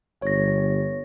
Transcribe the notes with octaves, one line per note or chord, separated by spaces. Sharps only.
G1 C#5 A#6